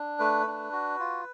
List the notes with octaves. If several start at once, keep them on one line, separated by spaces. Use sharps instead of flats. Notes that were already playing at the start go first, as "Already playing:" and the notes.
Already playing: D4
A3 B4
D4
F#4
F4